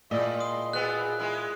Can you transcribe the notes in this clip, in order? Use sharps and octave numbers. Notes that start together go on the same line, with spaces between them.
A#2 G#3 E4 D5 D#5
C6 D#6
B2 B3 C4 G#4 F#6
G#3 B3 E4